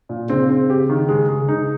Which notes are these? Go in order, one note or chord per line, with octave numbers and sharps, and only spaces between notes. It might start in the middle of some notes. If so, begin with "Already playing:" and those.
A#2
C#3 C4
C4
G4
D#3
G#3
G#3
D#4